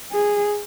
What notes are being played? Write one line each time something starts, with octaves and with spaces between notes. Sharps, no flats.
G#4